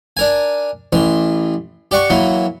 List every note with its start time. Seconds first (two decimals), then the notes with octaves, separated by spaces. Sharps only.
0.17 D4 A#4 G#5
0.93 A1 E3 C6
1.91 G4 D5 F#5 C#6
2.10 E3 F#3 A#3